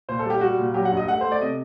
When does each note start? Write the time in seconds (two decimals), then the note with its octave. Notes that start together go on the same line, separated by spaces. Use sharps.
0.09 A#2 C5
0.19 A4
0.25 G3 G4
0.41 G3 F#4
0.58 A#2
0.74 F#3 G4
0.85 F#5
0.92 G2
0.97 D#5
1.08 A3 F#5
1.21 A3 C5
1.32 D5
1.41 C3 D#5